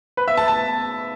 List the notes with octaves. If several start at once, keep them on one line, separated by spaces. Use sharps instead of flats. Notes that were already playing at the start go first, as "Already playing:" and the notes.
B4
E5
A5
A5